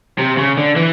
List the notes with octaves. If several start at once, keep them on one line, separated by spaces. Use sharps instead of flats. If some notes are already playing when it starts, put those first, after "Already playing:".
C3
C#3
D3
E3